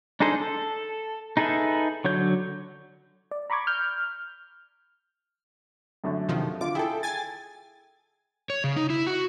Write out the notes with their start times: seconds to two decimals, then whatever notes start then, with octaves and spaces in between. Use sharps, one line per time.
0.20 D4 D#4 G#4 A4 C5
0.42 A4
1.37 D#4 G#4 A4 B4 E5
2.05 D3 F#3 C#5 G6
3.31 D5
3.50 A#5 B5 C#6 D6 G#6
3.67 F6 G6
6.04 F#2 D3 A3
6.29 C3 D#3 F3
6.61 D3 F4 D6
6.75 E4 G#4 A4 G5
7.03 G#5 A6
8.50 C#5
8.64 C#3
8.76 D#4
8.90 E4
9.07 F#4